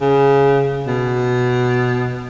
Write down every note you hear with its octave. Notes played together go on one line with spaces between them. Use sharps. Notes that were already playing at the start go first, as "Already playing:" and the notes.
C#3
B2